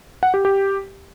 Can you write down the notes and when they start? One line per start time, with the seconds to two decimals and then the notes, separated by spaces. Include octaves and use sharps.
0.23 F#5
0.34 G4
0.45 G4